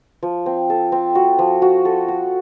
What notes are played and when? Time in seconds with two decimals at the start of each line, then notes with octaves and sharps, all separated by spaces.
0.23 F3
0.46 C4
0.70 A4
0.92 C4
1.15 F#4
1.39 F3
1.62 F#4
1.85 A4
2.08 F#4